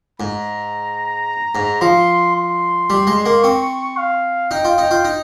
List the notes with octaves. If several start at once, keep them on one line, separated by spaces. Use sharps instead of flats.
G#2 A#5
G#2
F3 C6
C6
G3
G#3
A#3
C4 C#6
F5
D#4 G5
F4
D#4
F4
D#4